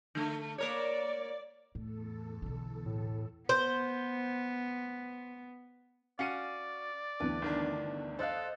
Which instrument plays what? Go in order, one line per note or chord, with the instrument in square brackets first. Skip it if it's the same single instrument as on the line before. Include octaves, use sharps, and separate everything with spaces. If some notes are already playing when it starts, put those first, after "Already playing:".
[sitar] D3 A3
[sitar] A#3 A#4 C#5 [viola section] D5
[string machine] E2 A4 [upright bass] A2
[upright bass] B1 D3
[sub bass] A2
[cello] B3 [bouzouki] C5
[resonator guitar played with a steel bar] C#4 F#4 F#5 [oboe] D5 [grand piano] F5 C#7 D#7
[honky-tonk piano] D2 E3 B3 [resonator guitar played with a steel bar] B4
[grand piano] G1 D#3 D4
[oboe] A4 [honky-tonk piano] C5 D#5 F#6 [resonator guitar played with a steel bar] D5 F5